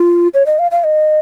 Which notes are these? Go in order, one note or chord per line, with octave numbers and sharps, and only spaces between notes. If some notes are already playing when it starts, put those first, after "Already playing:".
Already playing: F4
C#5
D#5
F5
F5
D#5